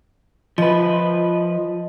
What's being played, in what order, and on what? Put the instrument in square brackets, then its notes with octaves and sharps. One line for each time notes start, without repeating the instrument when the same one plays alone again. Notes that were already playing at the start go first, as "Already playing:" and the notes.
[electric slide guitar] F3 B4 [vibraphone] D#5